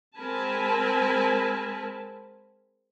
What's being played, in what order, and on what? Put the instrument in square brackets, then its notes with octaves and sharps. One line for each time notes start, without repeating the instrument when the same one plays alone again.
[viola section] G#3 C4 A#4 G#5 A5 B5